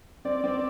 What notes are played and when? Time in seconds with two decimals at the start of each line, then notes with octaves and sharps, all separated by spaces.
0.25 C4 D5
0.44 C4